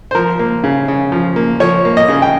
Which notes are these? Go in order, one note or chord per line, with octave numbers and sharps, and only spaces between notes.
C5
F3 A#4
A#3
C#3
C#3
F3
A#3
F3 C#5
A#3
D#5
C#3
G5